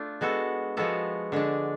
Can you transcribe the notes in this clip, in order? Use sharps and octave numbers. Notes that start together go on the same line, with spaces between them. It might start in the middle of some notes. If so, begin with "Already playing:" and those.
Already playing: A3 D4 F4
G#3 B3 F#4 A4
F3 G#3 B3 F#4 A4
D3 G#3 D4